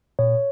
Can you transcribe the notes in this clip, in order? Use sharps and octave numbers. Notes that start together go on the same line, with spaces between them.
A#2 C#5